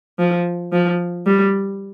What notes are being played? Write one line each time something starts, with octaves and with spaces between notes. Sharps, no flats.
F3
F3
G3